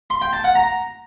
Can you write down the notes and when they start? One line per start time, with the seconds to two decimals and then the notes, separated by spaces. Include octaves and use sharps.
0.10 C6
0.22 G5
0.33 A5
0.44 F#5
0.55 A#5